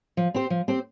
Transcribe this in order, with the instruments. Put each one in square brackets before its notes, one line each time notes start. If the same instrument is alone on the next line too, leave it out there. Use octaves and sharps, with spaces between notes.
[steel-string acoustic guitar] F3
C4 G4 C5
F3
C4 G4 C5